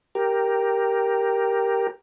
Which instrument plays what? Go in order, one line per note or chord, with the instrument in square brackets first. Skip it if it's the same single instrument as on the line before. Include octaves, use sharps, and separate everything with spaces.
[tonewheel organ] G4 A#4